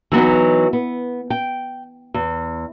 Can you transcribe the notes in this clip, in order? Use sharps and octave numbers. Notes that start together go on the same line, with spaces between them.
E3 F#3 B3 D#4
B3
G5
E2